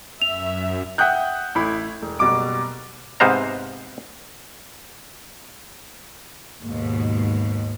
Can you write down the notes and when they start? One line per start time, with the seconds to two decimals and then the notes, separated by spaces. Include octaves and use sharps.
0.22 F#2 E5 F7
0.98 E5 F#5 G5 D#6 F#6 G6
1.55 A1 E4 B5
2.02 E1
2.19 F#1 B2 G3 D6 D7
3.20 G#2 C3 B3 C5 F5 A#5
6.62 D#2 G#2 B2